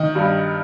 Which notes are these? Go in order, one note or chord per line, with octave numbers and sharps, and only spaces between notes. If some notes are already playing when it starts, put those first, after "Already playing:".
Already playing: D#3 D#5
G2